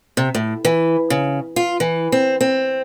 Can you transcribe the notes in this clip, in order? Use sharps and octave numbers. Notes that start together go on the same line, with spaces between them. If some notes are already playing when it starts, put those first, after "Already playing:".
C3
A2
E3
C#3
F4
E3
C4
C4